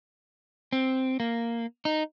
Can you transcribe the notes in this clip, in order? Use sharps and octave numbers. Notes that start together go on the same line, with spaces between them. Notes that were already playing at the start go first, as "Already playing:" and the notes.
C4
A#3
D#4